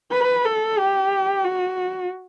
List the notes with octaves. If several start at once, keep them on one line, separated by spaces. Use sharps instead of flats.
B4
A4
G4
F#4